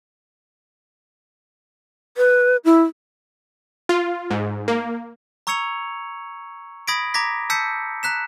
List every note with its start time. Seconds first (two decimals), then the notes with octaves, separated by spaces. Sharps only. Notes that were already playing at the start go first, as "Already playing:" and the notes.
2.17 B4
2.65 E4
3.89 F4
4.30 G#2
4.68 A#3
5.47 A#5 C#6 E6 G#6 C#7 F7
6.88 B5 D#6 G#6 A#6 B6 D7
7.14 A#5 D6 G#6 A#6 B6
7.50 A5 E6 G6 B6 C#7
8.03 A#5 F#6 B6 E7